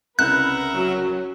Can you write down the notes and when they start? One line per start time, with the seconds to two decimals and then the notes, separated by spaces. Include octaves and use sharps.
0.19 C2 C#3 E4 A#4 B4 E5 F#5 F#6
0.74 F#3 C#4